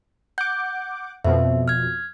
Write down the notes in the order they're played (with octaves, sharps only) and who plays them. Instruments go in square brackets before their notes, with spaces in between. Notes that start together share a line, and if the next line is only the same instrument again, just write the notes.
[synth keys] F#5 D6 [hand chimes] G6
[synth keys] F2 B2 F3 [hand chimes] E5
[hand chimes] F6 G#6